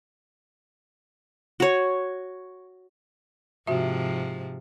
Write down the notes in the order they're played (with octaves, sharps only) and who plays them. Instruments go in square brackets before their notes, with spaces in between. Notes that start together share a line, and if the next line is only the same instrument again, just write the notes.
[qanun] F#4 C#5
[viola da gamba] G#2 C3 F3 [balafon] F#4 E5